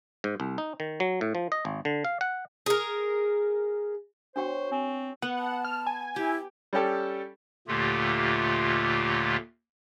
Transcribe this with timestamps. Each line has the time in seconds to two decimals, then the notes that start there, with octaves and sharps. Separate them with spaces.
0.24 G#2
0.40 C2
0.58 D#4
0.80 D#3
1.00 F#3
1.21 A2
1.35 F3
1.52 D#5
1.65 G#1
1.85 D3
2.05 F5
2.21 F#5
2.66 G#4 A#4
4.36 B3 D4 F#4 C5 C#5 G5 C6
4.72 C4 G#5
5.22 B3 F#5
5.38 A5
5.65 F6
5.87 G#5
6.16 E4 G4
6.73 G3 C#4 G4 A4
7.68 D#2 A#2 D3 A3 F4 G4